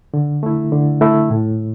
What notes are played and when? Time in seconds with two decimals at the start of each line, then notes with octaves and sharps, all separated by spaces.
0.14 D3
0.43 A3 E4
0.72 D3
1.01 A3 E4
1.30 A2